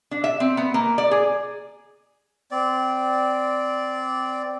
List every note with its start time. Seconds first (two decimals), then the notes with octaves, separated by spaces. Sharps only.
0.11 D4
0.24 E5
0.40 C4
0.57 B3
0.74 A#3
0.98 D5
1.11 G#4
2.51 C4 D5